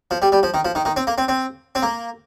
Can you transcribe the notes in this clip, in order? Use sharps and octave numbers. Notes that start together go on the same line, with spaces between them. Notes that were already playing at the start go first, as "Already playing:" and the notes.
F3
G3
G3
F3
D#3
F3
D#3
D#3
C4
A#3
C4
C4
C4
A#3